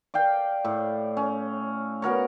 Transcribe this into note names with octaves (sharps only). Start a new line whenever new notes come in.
D5 F5 G5
A2
C#4
B3 F#4 A#4 C#5